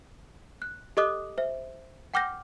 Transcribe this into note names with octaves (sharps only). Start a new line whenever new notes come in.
F#6
G4 A4 D#5 D6 D#6 F#6
C5 E5
F#5 G5 D6 F6 G6 A#6